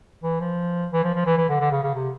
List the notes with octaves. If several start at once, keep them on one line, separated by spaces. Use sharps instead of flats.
E3
F3
E3
F3
F3
E3
E3
D3
D3
C#3
C#3
C3